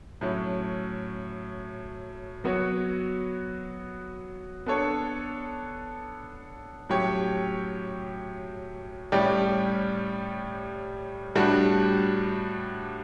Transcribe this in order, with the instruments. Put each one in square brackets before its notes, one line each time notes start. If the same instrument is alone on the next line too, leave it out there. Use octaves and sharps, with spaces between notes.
[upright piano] A2 F#3 C#4
F#3 B3 F#4 C#5
B3 D4 A4 C#5
A2 F#3 C#4 G4 C#5
A2 G3 C#4 G4 D5
A2 G3 D4 F#4